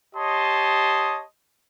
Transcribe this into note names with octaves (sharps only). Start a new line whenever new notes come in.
G4 C#5 D#5 A5 C6 D#6